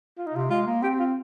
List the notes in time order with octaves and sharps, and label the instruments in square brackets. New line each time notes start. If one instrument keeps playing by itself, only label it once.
[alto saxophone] F4
D#4
[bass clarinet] C3 [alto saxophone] F4
[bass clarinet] G#3 [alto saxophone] F4
[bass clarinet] A#3
[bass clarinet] C4 [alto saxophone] G4
[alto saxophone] F4